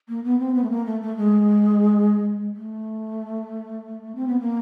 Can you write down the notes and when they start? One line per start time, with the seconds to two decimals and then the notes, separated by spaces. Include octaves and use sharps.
0.09 A#3
0.24 B3
0.40 C4
0.55 B3
0.63 A3
0.71 A#3
0.86 A3
1.01 A3
1.17 G#3
2.56 A3
4.15 C4
4.28 B3
4.40 A#3